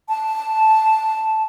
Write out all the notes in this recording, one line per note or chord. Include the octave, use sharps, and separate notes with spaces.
A5